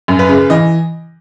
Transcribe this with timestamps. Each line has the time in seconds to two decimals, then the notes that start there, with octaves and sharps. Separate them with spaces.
0.08 F#2
0.19 B4
0.29 C#3
0.50 E3 D#5